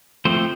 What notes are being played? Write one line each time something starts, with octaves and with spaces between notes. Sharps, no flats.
F3 A3 C4 C5